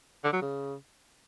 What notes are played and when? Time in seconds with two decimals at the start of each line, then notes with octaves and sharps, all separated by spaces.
0.24 D3
0.33 F#3
0.42 C#3